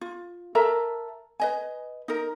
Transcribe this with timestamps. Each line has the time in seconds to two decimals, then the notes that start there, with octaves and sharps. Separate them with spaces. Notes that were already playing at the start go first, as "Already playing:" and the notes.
0.01 F4
0.55 A4 A#4 E5 A#5
1.40 B4 D#5 G#5
2.08 D#4 A#4